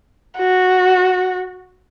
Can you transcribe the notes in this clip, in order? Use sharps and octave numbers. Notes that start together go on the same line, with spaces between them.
F#4